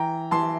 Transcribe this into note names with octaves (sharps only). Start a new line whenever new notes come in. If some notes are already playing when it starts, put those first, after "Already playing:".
Already playing: E3 G5 A#5
E3 A5 C6